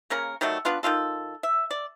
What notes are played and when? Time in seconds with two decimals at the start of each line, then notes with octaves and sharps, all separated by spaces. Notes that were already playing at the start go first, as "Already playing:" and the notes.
0.10 C#3 A#3 C#4 A#4
0.41 D#3 F#3 G3 A3
0.65 B3 D4 F4 B4
0.83 D#3 G3 F4 A4
1.43 E5
1.71 D5